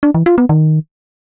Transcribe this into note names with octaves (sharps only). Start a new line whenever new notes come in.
D4
E3
F4
B3
D#3